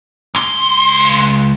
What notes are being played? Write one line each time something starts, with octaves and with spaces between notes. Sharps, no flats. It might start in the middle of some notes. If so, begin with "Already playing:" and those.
C#2 C6